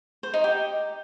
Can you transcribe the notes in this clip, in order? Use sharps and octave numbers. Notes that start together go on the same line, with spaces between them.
C5
D#4
G4